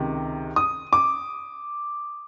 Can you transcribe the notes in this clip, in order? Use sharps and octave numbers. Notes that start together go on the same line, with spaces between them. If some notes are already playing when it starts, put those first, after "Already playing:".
Already playing: C#2 C3 D#3
D#6
D6